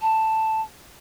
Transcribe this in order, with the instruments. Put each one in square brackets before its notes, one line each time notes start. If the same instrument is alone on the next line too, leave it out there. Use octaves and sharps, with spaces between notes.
[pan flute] A5